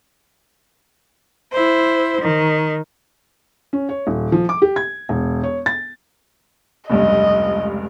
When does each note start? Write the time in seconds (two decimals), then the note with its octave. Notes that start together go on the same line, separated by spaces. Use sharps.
1.53 E4 C5
2.21 D#3
3.73 C#4
3.89 C#5
4.07 D#1
4.32 F3
4.49 D6
4.62 G4
4.76 G#6
5.09 E1
5.43 C#5
5.66 A6
6.89 F1 C#2 G2 D#5